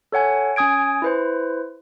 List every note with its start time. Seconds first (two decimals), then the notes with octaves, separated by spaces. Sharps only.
0.12 A4 C#5 F#5 G#5
0.56 C#4 G#5 D#6 G#6 D7
1.02 E4 B4 C5